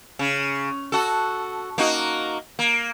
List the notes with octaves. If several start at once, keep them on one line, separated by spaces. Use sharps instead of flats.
C#3
F#4 A4
A#3 D#4 F#4
A#3